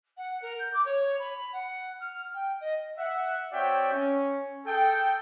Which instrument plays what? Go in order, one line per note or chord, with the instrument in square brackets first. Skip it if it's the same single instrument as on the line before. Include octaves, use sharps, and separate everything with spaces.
[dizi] F#5
A#4
G6
D6
C#5
B5
F#5
F6
G5
D#5
[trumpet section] E5 F#5
C4 F#4 C#5 D5 E5 G5
C#4
G#4 A4 G5